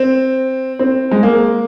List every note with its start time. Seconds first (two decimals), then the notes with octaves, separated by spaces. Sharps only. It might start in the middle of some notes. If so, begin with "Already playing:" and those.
Already playing: C4
0.79 C4
1.11 G#3
1.23 A#3